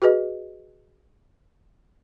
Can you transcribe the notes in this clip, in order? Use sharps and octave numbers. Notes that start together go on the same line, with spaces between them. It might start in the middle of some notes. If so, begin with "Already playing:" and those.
F#4 G#4 B4 D#5